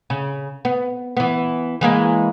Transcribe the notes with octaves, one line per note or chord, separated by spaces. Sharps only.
C#3
B3
E3 B3
E3 G#3 A#3